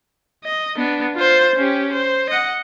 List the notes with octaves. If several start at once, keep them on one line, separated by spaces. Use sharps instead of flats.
D#5
B3 D4
F4 C5
C#4 G4
C5
D#5 F#5